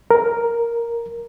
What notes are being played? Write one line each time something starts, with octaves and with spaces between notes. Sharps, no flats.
A#4